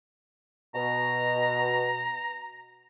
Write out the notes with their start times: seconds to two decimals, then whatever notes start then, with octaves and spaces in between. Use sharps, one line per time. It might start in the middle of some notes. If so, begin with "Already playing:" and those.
0.75 B2 A#5